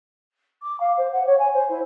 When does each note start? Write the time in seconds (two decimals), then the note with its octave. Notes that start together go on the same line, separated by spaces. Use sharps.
0.62 D6
0.80 F5
0.97 C5
1.12 F#5
1.27 C#5
1.39 G#5
1.54 C5
1.69 E4